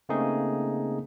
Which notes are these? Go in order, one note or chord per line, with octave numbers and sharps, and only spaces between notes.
C#3 A3 A#3 C4 D#4 G#4